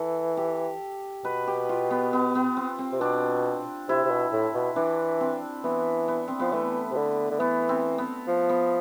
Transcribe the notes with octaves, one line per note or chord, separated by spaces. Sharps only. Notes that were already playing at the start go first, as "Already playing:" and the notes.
Already playing: E3 A4
G4
B2 B4
G4
F4
B3
B3
B3
C4
C4
C3
B2 D4
C3 E4
C3
B2
A2
B2
E3 D4
C4
E3 B3
B3
C4
F3 B3
E3 A3
C3
D3
D3
E3 B3
C4
B3
F3
B3